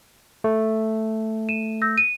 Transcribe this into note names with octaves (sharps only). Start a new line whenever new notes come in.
A3
D#7 E7
E6 G6 A#6
D#7